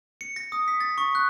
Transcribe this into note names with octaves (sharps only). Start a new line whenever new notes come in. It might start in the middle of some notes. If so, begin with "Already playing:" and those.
C#7
A#6
D#6
B6
A6
C#6
F#6